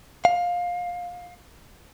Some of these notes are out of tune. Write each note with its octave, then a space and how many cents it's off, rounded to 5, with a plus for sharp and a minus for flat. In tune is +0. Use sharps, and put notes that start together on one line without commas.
F5 +20